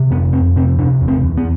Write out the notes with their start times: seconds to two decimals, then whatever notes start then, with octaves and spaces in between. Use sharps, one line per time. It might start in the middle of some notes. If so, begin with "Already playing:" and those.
Already playing: C3
0.11 F2 B3
0.33 F2 C4
0.56 C3 C4
0.78 C3 D4
1.01 E2
1.08 C4
1.24 E2
1.37 B3